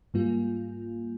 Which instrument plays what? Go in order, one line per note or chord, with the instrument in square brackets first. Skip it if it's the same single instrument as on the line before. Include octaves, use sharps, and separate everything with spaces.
[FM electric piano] G#2 G3 A#3 F4